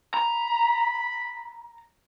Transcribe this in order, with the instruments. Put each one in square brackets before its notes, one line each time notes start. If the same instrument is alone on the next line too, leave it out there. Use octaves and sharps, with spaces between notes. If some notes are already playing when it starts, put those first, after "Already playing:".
[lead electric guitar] A#5 [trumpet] B5